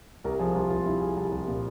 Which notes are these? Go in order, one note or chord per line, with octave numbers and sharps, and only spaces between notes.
C2 A#4
F3 G#4
C2 F4
C2 F4
C2 E4
C2 G#4
C2 G#4
C2
A#2